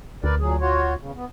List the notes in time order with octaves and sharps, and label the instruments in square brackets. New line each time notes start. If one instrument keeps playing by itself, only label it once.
[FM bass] D2 [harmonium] A#4 B4 D5
[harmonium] A#2 F#3 G#4
F4 F#4 C#5
E2 C#3
B3